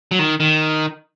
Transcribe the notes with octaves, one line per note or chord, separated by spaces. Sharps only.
F#3
D#3
D#3